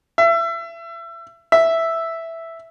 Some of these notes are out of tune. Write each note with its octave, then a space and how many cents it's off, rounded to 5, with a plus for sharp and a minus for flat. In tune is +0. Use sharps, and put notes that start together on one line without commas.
E5 +30
E5 +0